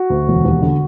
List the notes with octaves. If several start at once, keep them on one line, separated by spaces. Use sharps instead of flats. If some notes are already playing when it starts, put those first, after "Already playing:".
Already playing: F#4
D2
E1
D#2
D3